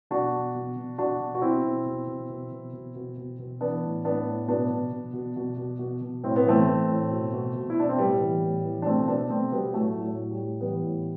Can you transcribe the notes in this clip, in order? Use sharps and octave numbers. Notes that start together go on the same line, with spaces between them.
B2 D4 F#4
B2
B2
B2
B2 D4 F#4
B2
F#4
B2 C4 E4
B2
B2
B2
B2
B2
B2
B2
B2
B2
E3 B3 D4
A2
A2 B3 D4
A2
B2 B3 D4
B2
B2
B2
B2
B2
B2
B2
A2 C4
B3
E3 A3 C4
E3
A2
B2
B2
B2
E4
B2 D4
C4
A2 G3 B3
E3
A2
E3
D4
B2 A3 C4
B2 B3 D4
B2 A3 C4
B2 G3 B3
A2 F#3 A3
A2
F#3
A2
G3
A2
E3 G3 B3
A2